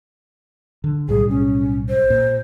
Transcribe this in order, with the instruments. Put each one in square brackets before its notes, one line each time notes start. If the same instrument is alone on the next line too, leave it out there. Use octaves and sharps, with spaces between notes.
[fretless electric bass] D3
[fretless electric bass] B1 A2 G3 [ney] G#4
[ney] C#4
C5
[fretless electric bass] A#2